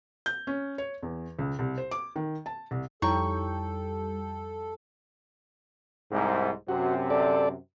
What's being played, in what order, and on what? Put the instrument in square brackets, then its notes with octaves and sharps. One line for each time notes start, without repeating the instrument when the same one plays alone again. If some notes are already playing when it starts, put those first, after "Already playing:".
[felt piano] G6
C#4
C#5
E2
C#2
C2
C5
D6
D#3
A5
C2
[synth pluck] F2 G3 G5 [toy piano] D#4 E4 C#5 [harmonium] A4 [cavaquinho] C#6
[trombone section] C2 G#2
[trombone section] F#2 C3 [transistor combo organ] F#4
[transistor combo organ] A4 D5